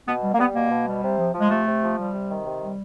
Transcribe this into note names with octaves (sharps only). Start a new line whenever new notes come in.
B2 B3
G3
A#3
G3 B3
B2 A#3
B2
G3
C3
F3
F3
G#3
C3 A3
C3
F3
G3
C3
D#3
C3
G3